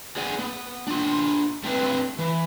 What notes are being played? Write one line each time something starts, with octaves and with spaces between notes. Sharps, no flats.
G#4 D5 F#5 G#5
B3
D4 F4
A3 C4 D4 E4 B4
E3